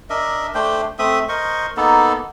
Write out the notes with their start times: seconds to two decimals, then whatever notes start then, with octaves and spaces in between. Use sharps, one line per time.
0.10 D4 A#4 D#5 E5
0.55 A3 D4 C5 G5
0.99 A3 C4 E5 D#6
1.29 A#4 C5 D#5 C#6
1.77 A#3 B3 D#4 A4